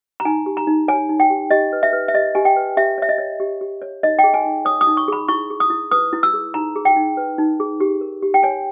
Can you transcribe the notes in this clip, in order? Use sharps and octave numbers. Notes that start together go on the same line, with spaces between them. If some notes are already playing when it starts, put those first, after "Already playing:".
A#5
D#4 G#5
G4
A#5
D#4
C#5 G#5
D#4
G5
G4
G4 D#5
B4
E5
B4
E5
G4 D#5
G4 G#5
G5
B4
G4 E5
C#5 E5
D#5
C#5
G4
G4
C#5
D#4 D#5
G5
G#4
G#5
D#4
C#5 D#6
D#6
D#4
C#6
G#4 B5
E4 C#6
G#4
D#6
E4
B4 D#6
E4
E6
G#4
D#4 A#5
G#4
G5
D#4
B4
D#4
G#4
G4
A#4
G4
G5
C#5 G#5